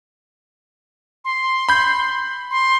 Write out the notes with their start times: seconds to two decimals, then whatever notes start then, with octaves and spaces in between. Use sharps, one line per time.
1.25 C6
1.69 B5 G6
2.51 C6